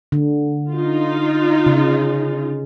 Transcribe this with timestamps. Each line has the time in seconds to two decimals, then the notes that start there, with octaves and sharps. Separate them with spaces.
0.12 D3
0.73 D#4 F4
1.66 C#3